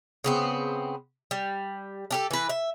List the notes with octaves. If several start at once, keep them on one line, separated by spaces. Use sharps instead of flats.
C#3 B3 C4
G3
D4 G4 A4
E3 B4
E5